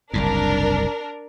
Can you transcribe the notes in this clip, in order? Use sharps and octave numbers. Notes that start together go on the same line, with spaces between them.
F#1 C2 G#2 D4 A#4